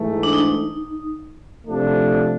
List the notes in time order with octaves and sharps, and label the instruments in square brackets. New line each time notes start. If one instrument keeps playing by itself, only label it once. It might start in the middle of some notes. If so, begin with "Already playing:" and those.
Already playing: [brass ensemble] G#2 E3 A3
[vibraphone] D4
D#4
[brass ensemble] C3 F3 A3 D4